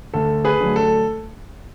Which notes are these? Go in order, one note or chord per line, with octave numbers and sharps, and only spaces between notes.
D2 A4
G#4 B4
D3 F#3 A3
A4